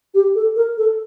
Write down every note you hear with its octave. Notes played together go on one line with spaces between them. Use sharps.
G4
A4
A#4
A4